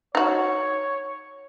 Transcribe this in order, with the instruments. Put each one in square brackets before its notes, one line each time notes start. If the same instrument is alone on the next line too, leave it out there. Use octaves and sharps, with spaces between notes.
[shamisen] D#4 F#4 [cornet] C#5